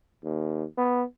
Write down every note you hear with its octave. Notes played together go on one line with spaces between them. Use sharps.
D#2
B3